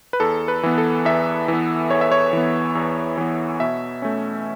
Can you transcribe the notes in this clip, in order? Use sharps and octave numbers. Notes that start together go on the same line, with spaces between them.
B4
E2 A4
B4
E3 B3
A4
E2 E5
E3 B3
E2 C#5
E5
C#5
E3 B3
E2
E3 B3
B2 E5
A3 C#4